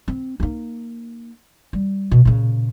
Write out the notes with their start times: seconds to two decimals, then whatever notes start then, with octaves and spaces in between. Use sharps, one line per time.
0.08 C4
0.40 A#3 D#4
1.73 G3
2.11 B2
2.25 A#2 C#3